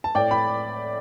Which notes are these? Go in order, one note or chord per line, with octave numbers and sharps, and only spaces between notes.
A5
A2 D5 G5
G5 B5